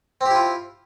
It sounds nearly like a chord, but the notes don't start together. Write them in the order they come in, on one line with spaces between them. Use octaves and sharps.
C4 G4 E4 F4